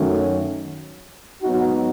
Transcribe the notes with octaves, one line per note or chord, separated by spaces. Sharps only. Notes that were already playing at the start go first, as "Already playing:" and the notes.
Already playing: F#2 D#3 F#3 A3 C#4
G#2 F#3 B3 D#4 F#4